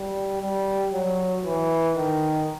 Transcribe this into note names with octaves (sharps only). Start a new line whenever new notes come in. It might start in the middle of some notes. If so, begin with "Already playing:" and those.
Already playing: G3
G3
F#3
E3
D#3